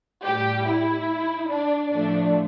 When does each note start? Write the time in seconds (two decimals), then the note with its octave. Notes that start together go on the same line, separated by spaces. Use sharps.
0.25 A2 G3 G4
0.66 E4
1.50 D4
1.91 A2 F3 A3 D4